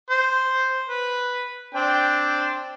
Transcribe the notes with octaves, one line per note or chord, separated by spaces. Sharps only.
C5
B4
C4 D4 G5